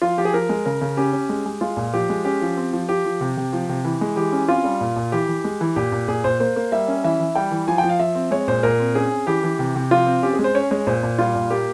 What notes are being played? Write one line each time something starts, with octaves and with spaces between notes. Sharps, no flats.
F3 F4
F3 G4
G#4
F3 A#4
G#3
C#3 A#4
C#3
C#4 G4
C#4
G#3
G#3
G#3 F4
A#2
F3 G4
G#3
C#4 G4
F3
C4
F3
F3 G4
F3
C3
C3
F3
C3
E3
G#3
E3 G4
C#4
C4 F4
G3
A#2
A#2
E3 G4
E3
G#3
E3
A#2 G4
A#2
A#2 G#4
A#2 C5
A#3 C5
A#3
G3 E5
C#4
E3 E5
E3
G3 G5
E3
F3 G#5
G5
F3
F5
F3 E5
C4
G#3 C#5
A#2 C5
A#2 A#4
C4
C#4 G#4
C#4
E3 G4
E3
C3
C3
F3 F4
C4
C#4 G4
G#4
G#3
C5
C#4 C#5
G#3 C#5
A#2 C5
A#2
G3 F4
A#2
A#3 G4